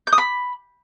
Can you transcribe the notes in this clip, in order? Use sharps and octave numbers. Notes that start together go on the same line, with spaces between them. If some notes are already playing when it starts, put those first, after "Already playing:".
G6
D#6
B5